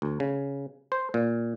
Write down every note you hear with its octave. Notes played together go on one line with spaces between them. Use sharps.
D2
C#3
C5
A#2